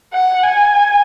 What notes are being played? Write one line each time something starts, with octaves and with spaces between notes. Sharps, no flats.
F#5
G#5